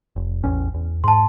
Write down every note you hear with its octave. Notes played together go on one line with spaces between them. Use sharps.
F1
A1 E2 C#4
E2
G#2 A5 C6